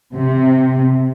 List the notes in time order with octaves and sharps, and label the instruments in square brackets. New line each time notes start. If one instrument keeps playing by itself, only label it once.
[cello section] C3